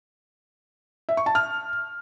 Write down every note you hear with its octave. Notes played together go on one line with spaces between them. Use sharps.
E5
C#6
A5
F6